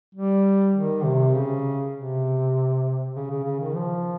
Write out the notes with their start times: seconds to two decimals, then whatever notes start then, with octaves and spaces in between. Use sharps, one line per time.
0.15 G3
0.75 D#3
1.04 C3
1.34 C#3
1.95 C3
3.15 C#3
3.30 C#3
3.44 C#3
3.59 D#3
3.75 F3